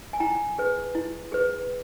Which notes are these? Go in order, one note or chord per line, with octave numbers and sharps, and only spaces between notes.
G#5
E4 G5 A#5
G#4 B4
E4
G#4 B4